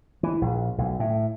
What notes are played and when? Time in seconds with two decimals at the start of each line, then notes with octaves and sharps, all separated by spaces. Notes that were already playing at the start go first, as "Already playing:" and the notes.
0.23 E3
0.42 A#1
0.78 B1
1.00 A2